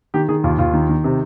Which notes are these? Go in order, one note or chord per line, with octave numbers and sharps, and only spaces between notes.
D#3 G4
D#3 G#4
D#2 F4
D#2 F4
D#3
D#3
C3